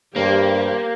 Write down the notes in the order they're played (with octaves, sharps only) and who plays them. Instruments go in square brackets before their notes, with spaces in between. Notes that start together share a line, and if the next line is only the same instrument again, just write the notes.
[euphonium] G2 [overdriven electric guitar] A#3 [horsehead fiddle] G4 [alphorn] C5